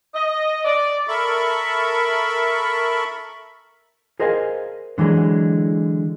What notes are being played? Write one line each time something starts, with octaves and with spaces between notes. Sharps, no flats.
D#5
D5
A4 A#4 E5 B5 C#6
G#4 A#4 C5 D#5 F5 G#5
D3 E3 F#3 G#3